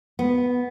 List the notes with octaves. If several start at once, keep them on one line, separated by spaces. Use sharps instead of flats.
B3